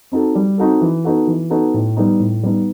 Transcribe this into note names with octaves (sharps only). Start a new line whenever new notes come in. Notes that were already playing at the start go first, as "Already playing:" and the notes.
C4 D#4 F#4 A4
G3
C4 D#4 F#4 A4
E3
B3 D#4 F#4 A4
E3
B3 D#4 F#4 A4
A2
G3 B3 D#4
A2
G3 B3 D#4